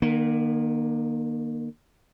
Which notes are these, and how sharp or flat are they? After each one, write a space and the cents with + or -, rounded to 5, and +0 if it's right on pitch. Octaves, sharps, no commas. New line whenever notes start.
D#3 -35 A#3 +20